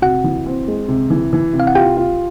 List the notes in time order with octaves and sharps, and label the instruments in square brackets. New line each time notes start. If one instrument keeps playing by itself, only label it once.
[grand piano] C3 [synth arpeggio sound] F#4 F#5
[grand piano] E3
C4
G#3
C3
E3
E3
C3
[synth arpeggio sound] F5
F#5
[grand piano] F4 [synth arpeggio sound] G4 G5
[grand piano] F4